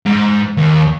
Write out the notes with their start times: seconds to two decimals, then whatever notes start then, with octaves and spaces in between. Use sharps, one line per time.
0.06 G#2
0.57 D#2